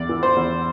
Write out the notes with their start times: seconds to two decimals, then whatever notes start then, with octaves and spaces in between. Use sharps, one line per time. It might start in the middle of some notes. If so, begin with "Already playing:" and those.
Already playing: E2 D5
0.09 E3
0.23 C5
0.36 E2